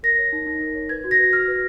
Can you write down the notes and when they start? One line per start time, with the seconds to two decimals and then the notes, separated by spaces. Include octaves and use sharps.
0.03 A#4 A#6
0.18 C#5
0.32 D#4
0.47 D#4
0.61 A#4
0.75 C#5
0.89 B4 G#6
1.04 F#4
1.11 A#6
1.19 B4
1.33 F#4 F6
1.48 B4